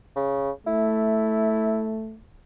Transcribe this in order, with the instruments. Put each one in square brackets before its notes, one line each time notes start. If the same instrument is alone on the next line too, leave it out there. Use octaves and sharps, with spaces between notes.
[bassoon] C#3
[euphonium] A3 [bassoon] E4